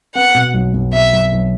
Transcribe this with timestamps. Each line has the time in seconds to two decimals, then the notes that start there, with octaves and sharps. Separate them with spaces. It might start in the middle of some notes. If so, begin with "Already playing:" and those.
0.15 B3 F#5
0.35 B2
0.54 B1
0.73 B1
0.93 B2 E5
1.13 B1
1.32 B1